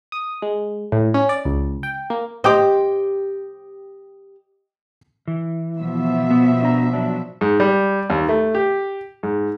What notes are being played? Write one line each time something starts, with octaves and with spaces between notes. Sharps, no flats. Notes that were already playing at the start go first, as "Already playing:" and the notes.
D#6
G#3
A2
C#4
D5
C#2
G5
A#3
G4 C5 D#5 G5 D6
E3
B2 F3 E5
B3
D4 A#5
F#3 D4
G#2
G3
D#2
A3
G4
G#2